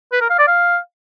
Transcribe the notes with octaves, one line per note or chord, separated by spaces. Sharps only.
B4
A#4
F5
D5
F5